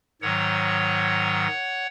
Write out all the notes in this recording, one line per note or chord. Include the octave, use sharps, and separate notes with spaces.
G#2 D#3 F#3 C#5 F#5